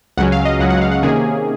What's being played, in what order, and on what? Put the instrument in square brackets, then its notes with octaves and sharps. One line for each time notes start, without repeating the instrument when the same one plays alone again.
[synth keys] C#2 C#3 F#3 C#4 F#5
F5
D#5
C#2 C#3 F#3 C#4 F#5
F#5
F5
F#5
C3 D#3 A#3 C#4 G#4